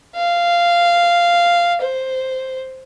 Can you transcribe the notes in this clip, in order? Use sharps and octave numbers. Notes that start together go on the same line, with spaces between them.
F5
C5